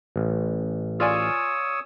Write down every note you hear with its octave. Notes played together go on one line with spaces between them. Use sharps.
A1
F4 C#5 D5 G#5 D#6 E6